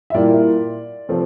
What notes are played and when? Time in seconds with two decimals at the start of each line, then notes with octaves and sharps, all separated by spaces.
0.10 E5
0.14 A#2 G3 A#3 E4 D5
1.09 C3 F3 A3 C4